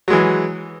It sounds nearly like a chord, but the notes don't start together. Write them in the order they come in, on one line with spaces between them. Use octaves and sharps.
F#3 G#3 E3